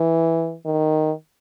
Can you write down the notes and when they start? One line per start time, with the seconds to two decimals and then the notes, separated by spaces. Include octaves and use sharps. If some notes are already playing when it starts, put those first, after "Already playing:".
Already playing: E3
0.65 D#3